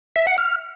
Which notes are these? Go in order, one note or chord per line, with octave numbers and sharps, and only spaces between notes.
E5
F#5
F6